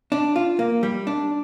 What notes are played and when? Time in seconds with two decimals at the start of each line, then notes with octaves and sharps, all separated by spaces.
0.12 D4
0.36 F4
0.59 A#3
0.83 G3
1.07 D4